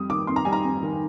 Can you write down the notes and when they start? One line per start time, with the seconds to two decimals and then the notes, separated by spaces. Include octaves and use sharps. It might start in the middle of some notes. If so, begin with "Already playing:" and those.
Already playing: F2 G3 D#6
0.09 D#3 D6
0.27 F2 C6
0.36 A#5
0.45 G3 G#5
0.53 A#5
0.64 F2
0.83 D#3